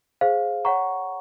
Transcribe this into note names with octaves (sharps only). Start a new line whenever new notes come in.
G#4 C5 F5
C#5 F#5 A#5 C#6